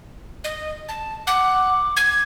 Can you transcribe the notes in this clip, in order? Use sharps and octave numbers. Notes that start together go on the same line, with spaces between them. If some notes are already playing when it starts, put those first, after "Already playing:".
D#5
A5
F#5 D6
G#6